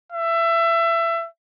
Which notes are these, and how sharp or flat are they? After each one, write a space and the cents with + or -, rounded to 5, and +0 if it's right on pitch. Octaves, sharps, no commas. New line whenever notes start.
E5 +25